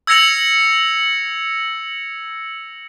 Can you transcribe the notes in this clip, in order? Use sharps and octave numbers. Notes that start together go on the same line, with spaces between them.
E6 G#6 A#6 C#7 F7 F#7